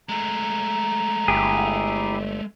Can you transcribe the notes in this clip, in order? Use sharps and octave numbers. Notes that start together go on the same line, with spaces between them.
G#3 A3 A#5
G1 E4 G4 G#4